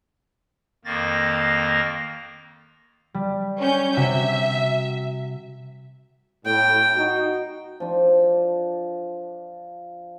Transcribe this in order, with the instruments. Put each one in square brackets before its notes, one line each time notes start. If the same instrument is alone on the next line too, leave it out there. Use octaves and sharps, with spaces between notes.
[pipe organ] F2 D#3 A#3 A6 A#6
[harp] G3
[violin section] C#4 G6
[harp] C3 F#4 [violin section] E5
[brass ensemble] A2 [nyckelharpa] G5
[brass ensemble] D#4 F#4
[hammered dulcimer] F3 D4